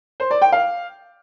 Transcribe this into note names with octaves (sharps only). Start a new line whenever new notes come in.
C5
D5
G5
F5